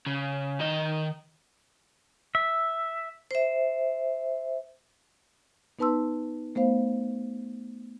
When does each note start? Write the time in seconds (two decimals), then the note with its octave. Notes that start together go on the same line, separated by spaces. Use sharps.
0.07 C#3
0.60 D#3 D#5
2.35 E5
3.31 C5 E5
5.79 B3 D#4 B4 A5 C6 E6
6.55 A3 B3 C5 F5